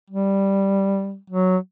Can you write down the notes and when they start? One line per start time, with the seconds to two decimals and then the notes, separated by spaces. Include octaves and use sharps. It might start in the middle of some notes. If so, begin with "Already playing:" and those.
0.10 G3
1.30 F#3